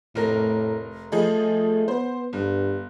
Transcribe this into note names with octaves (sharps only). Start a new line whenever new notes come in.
F1 A2 A#4 A#6
F3 A3 G#4 D#5
B3 C5
G1 G2